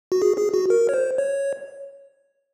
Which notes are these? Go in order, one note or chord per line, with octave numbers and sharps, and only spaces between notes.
F#4
G#4
G#4
F#4
A#4
C#5
C5
C#5